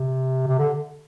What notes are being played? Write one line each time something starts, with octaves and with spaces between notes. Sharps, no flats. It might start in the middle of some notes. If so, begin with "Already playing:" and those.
Already playing: C3
C3
D3